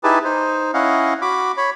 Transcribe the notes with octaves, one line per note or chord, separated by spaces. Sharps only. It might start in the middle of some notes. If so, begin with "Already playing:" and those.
D#4 E4 G4 G#4 B4 A5
D#4 C5
C#4 E4 D#5 F5 F#5
F#4 B5 D6
C#5 B5